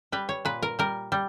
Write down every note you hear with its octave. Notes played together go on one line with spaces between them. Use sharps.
G3 B4
C#5
A#2 B4
A#4
G3 A#4
G3